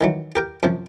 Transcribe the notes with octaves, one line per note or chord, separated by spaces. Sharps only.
D#3 E3 F#3
G4 A#4 G5
F#2 C3 F3